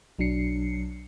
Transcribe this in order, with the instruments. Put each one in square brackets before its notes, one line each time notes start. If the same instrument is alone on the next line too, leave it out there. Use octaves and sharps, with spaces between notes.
[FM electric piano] B1 F#3 D4 C7 C#7